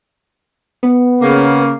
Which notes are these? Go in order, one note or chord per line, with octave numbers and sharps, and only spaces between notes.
B3
C#3 A#3